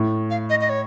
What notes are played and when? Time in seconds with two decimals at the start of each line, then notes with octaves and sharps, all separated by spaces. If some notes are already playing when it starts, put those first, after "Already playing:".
Already playing: A2
0.30 F5
0.50 D#5
0.61 D#5
0.69 C#5